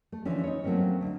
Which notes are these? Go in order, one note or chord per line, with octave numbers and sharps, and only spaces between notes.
A3
D3 E3 F3 C#4
D#4 C#5
F#3 A3 A#3 C4 C#4
D2